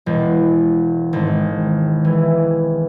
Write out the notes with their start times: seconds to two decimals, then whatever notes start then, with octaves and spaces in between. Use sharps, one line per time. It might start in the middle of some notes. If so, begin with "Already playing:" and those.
0.06 E1
1.13 G#1
2.05 E3